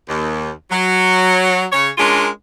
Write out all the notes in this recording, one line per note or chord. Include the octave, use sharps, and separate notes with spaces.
D#2
F#3
C#3 C#5
G#3 C#4 D4 F4 A#4